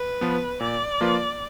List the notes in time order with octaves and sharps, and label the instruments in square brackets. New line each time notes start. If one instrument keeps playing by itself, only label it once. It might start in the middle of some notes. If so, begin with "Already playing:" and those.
Already playing: [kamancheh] B4
[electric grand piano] F3 B3
[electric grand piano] A#2 [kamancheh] D5
[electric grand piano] F3 A#3 F4 B4